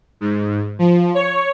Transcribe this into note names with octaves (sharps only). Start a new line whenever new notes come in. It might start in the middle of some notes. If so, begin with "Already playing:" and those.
G#2
F3
C#5